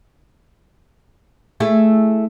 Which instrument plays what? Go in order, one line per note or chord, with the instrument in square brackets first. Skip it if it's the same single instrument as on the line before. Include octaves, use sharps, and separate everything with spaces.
[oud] A3 E4 G#4